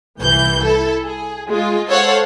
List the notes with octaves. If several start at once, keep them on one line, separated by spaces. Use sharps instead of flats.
C2 E3 G6
E4 A4
G#4
G#3 F4
A4 C5 C#5 F5 F#5